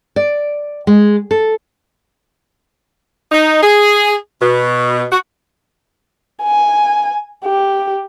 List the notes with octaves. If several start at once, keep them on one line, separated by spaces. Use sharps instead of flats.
D5
G#3
A4
D#4
G#4
B2
F#4
G#5
G4